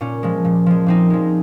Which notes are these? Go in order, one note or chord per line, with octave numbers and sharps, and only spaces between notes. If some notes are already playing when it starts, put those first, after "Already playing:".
A#2 C#4
F3 G#3
A#2
F3 G#3
A#2 C4 D#4
F3 G#3